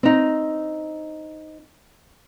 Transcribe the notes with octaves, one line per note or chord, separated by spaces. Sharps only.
C4 D#4